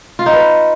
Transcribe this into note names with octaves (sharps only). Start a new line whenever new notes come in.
F4
D#4
B4